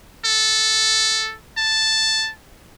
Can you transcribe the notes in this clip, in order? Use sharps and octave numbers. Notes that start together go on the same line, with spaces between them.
A4
A5